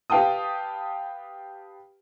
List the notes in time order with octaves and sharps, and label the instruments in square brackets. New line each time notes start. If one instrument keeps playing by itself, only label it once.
[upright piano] G4 B4 F5 G5 A5 D#6